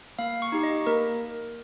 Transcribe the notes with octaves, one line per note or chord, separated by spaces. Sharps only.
A#3 F5
C#6
D#4 G4
D#5
A#3 A#4